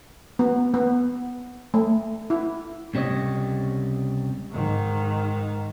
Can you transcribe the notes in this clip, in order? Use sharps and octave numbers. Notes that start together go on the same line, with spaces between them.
B3
B3
A3
E4
C#2 C3 G3 C#5 D#5
G#2 D#3